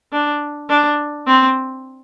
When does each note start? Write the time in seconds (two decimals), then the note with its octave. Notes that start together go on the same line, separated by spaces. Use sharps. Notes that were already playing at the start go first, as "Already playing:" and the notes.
0.12 D4
0.69 D4
1.27 C4